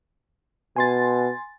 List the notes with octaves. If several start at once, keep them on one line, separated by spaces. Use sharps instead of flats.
B2 G#5 C6 A6